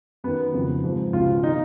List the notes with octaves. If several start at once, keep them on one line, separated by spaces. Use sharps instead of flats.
F#2 D#3 B3
F2 C#3 F3
G#2 F3
C#2 B2 F4
D#3 D#4